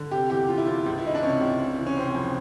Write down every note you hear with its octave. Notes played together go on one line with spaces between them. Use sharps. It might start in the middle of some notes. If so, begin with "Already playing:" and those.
Already playing: D3
C3 G4
E2 G4
E2 F4
E4
E2 F4
C#2
E4
E3 D#4
D4
C3 C#4
C#2
C3
E3
C#4
C3 C4
F2